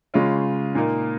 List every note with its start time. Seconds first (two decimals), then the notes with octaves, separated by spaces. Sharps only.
0.14 C#3 G#3 C#4 F4
0.75 A#2 A#3 D#4